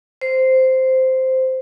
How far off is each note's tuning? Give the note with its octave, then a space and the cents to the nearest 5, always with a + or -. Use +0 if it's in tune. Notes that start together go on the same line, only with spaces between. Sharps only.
C5 -5